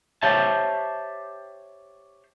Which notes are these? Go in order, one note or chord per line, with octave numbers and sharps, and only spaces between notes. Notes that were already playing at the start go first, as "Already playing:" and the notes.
G4 C5 C#5 E5 A5